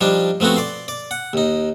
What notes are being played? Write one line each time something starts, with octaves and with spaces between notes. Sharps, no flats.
F3 G3 D4 D#4
F3 A3 B3 C4 F#4
D5 C6
D5
F#5
D#2 D#4